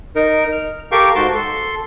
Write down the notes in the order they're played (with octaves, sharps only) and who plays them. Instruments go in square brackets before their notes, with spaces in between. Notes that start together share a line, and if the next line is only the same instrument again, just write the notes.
[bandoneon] D#4 A#4
F6
G4 A4 A#4 F5 G5 C#6
G#2 F#4 A5 C6
A4 C6